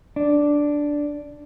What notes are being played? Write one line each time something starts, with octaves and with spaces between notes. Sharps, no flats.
D4